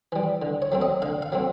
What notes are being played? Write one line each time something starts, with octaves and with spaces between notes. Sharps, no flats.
E3 G3
D3
C#5
F#3 A3 C4
D#5
D3 F5
F5
F#3 A3 C4